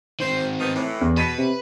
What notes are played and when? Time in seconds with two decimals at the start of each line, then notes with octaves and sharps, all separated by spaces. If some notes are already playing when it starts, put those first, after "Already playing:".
0.20 D#3 C4 C5
0.59 F3 B3 D#4
0.75 A2 E3
1.01 E2
1.17 B2 B4 B6 D#7
1.38 C3